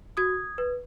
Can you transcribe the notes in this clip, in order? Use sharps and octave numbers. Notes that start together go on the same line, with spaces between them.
F#4 D#6 G#6
B4